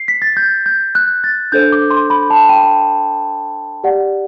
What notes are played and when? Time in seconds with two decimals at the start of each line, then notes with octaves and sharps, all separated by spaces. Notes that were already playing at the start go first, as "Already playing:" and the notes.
Already playing: C7
0.08 B6
0.22 A6
0.37 G6
0.66 G6
0.95 F#6
1.24 A6
1.52 D4 A4 C5 G6
1.72 D6
1.91 C6
2.10 B5
2.30 A5
2.49 G5
3.84 G4 D5 F#5